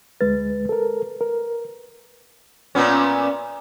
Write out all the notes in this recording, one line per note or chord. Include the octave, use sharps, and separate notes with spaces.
D2 G#3 B4 A6
A4 A#4
A#4
A#2 B3 C#4